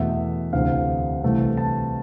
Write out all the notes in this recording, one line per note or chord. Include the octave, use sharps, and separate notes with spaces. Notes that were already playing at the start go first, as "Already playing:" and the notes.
Already playing: E2 B2 A3 E5
D2 C3 E3 A3 F5
C2 C3 E3 A3
A5